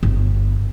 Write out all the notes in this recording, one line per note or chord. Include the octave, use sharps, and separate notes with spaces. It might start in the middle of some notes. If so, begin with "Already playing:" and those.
G1